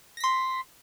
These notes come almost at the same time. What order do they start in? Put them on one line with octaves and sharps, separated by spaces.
A#6 B6 C6